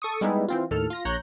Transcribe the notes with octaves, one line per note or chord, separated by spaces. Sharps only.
A4 C#6 D#6
G3 G#3 B3 D#4 E4
E3 C4 F4
D#2 A2 A4 F6
F4 A#6
A#1 C#5 A#5 F#6 G6